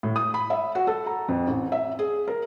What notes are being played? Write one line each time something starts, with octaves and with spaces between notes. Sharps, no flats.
A2
D#6
B5
E5
F#4
A4
A#5
F2
A1
E5
G#4
A#4